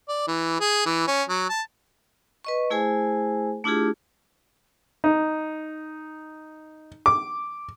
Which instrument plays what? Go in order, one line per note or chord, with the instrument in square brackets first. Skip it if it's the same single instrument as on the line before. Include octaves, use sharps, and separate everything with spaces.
[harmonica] D5
E3
G#4
E3
C#4
F#3
A5
[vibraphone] B4 D#5 C#6
A3 E4 G#4 C5 G#5
A3 D4 E4 F4 G4 G#4
[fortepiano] D#4
D6